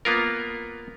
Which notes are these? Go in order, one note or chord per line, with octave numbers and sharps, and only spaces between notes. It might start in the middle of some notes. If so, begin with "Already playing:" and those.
A#3 B3 F4 A#4